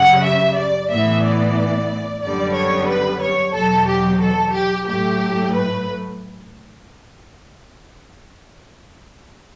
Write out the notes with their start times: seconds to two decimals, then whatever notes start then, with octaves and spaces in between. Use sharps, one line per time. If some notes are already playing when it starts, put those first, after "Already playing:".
Already playing: F#2 C#3 G3 F#5
0.24 E5
0.58 D5
0.90 A2 E3 B3 E5
1.24 D5
2.23 F#2 D3 G3 B3 D5
2.55 C#5
2.89 B4
3.21 C#5
3.54 E2 B2 F#3 A4
3.88 G4
4.21 A4
4.54 G4
4.86 A2 F#3 A3 G4
5.53 B4